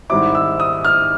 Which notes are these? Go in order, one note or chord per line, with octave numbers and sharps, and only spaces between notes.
G#2 D#3 G3 C4 E4 D6
E6
D#6
F6